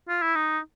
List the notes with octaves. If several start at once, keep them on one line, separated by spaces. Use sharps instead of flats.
F4
E4
D#4